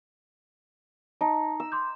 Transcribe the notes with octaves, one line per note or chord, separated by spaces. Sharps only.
D#4 A5
E6
C6 D6 G6